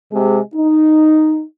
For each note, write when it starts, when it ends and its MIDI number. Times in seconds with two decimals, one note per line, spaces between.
0.12 0.40 48
0.12 0.40 56
0.54 1.42 63